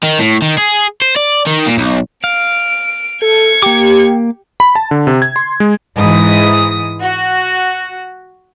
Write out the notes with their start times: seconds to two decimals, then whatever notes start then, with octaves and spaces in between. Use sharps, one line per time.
0.03 D#3
0.19 A2
0.42 D#3
0.58 G#4
1.02 C5
1.16 D5
1.47 D#3
1.67 A#2
1.78 B1
2.24 F5 D7
3.22 A4 G#6 C#7
3.62 A#3 G4 D6
4.60 B5
4.75 A5
4.91 D3
5.07 C3
5.22 G#6
5.36 C6
5.60 G#3
5.97 G#2 E3 D#6
7.03 F#4